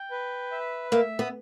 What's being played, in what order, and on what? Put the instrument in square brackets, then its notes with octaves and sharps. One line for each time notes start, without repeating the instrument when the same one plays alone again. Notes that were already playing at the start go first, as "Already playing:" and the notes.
Already playing: [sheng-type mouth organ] G5
B4
E5
[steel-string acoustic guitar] A#3 [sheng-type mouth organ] E5
[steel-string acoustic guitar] B3